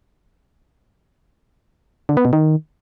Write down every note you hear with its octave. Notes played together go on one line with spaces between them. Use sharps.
D3
B3
B2
D#3